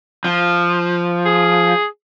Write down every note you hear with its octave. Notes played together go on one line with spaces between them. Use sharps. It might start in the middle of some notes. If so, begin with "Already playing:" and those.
F3
G#4